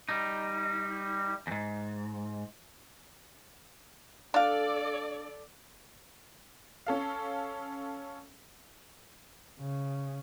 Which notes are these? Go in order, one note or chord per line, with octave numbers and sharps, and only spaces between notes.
G3 D#4
E2 G#2
D4 A4 D5 F5
C#4 A4 F5
C#3